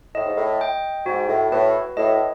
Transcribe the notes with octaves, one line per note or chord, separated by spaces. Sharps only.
A2 D#5
G#2
A2
G5
G#2 F#4
A2
A2 B4
A2 D#5